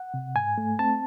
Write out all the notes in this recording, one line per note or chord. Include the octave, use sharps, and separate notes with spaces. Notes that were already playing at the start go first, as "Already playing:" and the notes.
Already playing: F#5
C3
G#2 G#5
A3
C4 A5